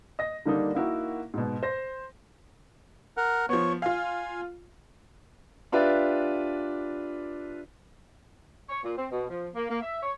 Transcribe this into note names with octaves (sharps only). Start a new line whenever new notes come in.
D#5 A#6
D3 D#3 G3 A#3 D4 D#4
A#3 D#4 E4 F#4 A#4
G#2 B2
C5 A#6
A#4 F#5
F3 B3 C#5
F4 F5 G#5
D4 F4 G4 B4 D5 E5
C#5
A#2
C4
B2
F3
A#3
A#3
E5
C#5